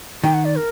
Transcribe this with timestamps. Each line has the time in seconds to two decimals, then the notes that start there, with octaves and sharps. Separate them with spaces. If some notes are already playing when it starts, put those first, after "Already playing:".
0.24 D#3 G5
0.34 F#5
0.45 D5
0.56 A#4